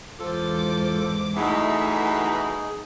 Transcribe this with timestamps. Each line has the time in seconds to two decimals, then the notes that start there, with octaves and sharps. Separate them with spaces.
0.19 E2 G#2 F4 A4 C5 D6
1.37 E2 B2 E3 A3 D#4 G#4 E5